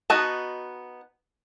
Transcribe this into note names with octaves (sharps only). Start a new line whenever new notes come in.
B3 D#4 F#4 D#5 A5